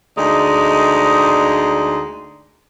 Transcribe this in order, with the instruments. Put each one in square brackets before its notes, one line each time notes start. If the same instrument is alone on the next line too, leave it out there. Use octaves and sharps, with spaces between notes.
[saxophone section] D2 G#3 D#4 G#4 D5